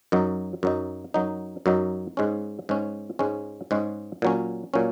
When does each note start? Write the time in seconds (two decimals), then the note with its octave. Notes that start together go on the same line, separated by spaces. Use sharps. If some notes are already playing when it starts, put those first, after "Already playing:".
0.12 F#2 F#3 D#4
0.63 F#2 F#3 D#4
1.14 F#2 F#3 D#4
1.66 F#2 F#3 D#4
2.17 G#2 G#3 C#4
2.69 G#2 G#3 C#4
3.19 G#2 G#3 C#4
3.71 G#2 G#3 C#4
4.22 A#2 F#3 C#4
4.74 A#2 F#3 C#4